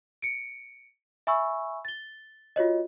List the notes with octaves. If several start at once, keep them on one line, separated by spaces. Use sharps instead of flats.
C#7 D7
E5 G#5 B5 C#6 E6
A6 G7
F4 F#4 C#5 D#5